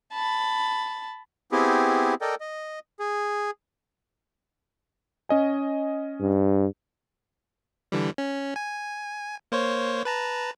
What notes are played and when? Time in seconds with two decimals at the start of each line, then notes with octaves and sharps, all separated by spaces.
0.14 A5 B5
1.52 B3 C4 E4 G4 G#4
2.21 A4 A#4 D5 D#5 G5
2.40 D#5
2.99 G#4
5.29 C#4 D#5 G#5
6.20 G2
7.92 D3 E3 G3
8.18 C#4
8.56 G#5
9.52 A#3 C5 C#5
10.05 B4 A5 A#5